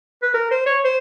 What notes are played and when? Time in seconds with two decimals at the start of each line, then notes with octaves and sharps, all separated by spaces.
0.22 B4
0.34 A#4
0.51 C5
0.66 C#5
0.84 C5